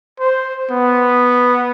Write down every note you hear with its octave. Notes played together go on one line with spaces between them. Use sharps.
C5
B3